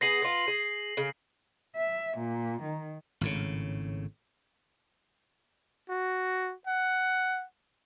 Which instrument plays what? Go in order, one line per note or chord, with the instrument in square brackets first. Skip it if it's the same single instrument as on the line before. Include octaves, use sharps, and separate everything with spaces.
[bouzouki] B3 G#4 [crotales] A#6 C7 F#7
[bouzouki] B3 F4
G#4
C#3
[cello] E5
A#2
D#3
[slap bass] G#1 A2 C#3
[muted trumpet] F#4
F#5